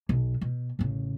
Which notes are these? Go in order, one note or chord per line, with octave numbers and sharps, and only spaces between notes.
B1
B2
A1 C#3